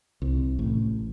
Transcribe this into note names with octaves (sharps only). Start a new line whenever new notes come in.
C2
A1